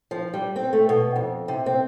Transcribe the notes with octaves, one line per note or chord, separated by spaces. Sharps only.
F3
G3
C4
A3
B2
F2
C3
C4